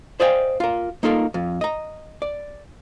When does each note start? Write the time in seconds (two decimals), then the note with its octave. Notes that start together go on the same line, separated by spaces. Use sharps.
0.20 C5 D5 D#5 F5 G5 G#5
0.60 F4 A#4
1.03 A#3 D#4 F4 A4 A#4
1.34 F2
1.61 D#5 A#5
2.22 D5